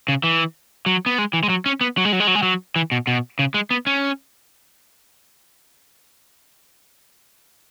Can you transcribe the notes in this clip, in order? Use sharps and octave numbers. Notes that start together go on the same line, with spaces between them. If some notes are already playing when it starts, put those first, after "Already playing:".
C#3
E3
F#3
B3
G#3
E3
G#3
F#3
C#4
B3
F#3
G#3
F#3
G#3
F#3
G#3
F#3
E3
B2
B2
C#3
G#3
B3
C#4